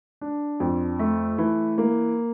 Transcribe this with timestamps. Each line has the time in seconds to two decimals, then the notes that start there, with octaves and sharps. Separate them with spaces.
0.21 D4
0.60 F2
0.99 A3
1.38 E3
1.78 A#3